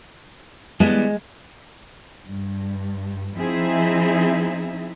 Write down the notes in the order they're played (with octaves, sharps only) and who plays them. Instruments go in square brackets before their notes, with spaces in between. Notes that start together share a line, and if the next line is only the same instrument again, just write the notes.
[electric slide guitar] E3 G3 B3 [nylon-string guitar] G#3
[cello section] G2
F3 C4 D#4 E4 G#4 E5